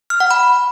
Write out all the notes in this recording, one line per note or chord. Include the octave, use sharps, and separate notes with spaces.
F6
F#5
B5